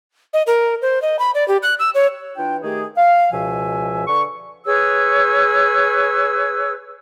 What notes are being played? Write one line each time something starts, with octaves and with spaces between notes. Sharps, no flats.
D#5
A#4
C5
D#5
B5
D5
G4
F#6
E6
C#5
E3 D4 F4 G5
D#3 A3 G4 G#4
F5
C#2 B2 F3 E5 G#5
D3 B4 C#6
G#4 B4 C#5 E6